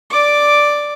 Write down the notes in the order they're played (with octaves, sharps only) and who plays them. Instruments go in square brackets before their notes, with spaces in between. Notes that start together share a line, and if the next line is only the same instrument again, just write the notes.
[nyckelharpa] D5 D6